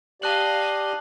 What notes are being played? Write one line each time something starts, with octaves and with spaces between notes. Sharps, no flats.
G4 D5 D#5 F5 A5 F#6 F#7